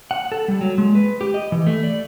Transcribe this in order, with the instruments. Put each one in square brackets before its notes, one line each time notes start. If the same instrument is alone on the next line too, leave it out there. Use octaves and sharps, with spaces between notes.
[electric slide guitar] F#5
A4
G3
F#3
G#3
B4
G4
D#5
E3
A3
D5